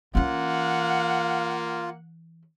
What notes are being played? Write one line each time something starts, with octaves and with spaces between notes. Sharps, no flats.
E3 A#3 C#4 F4 F#5